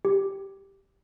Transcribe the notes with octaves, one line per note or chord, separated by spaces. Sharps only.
G4